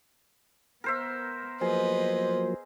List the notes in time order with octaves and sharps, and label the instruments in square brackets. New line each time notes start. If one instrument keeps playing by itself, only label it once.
[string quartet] B3 [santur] A#4 C5 E5
[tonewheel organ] F3 F#3 A#3 [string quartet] B3 B4 D#5 [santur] G#4 [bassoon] C5